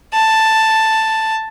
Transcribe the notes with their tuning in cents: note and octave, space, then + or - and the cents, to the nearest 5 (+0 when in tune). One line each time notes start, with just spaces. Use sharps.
A5 +5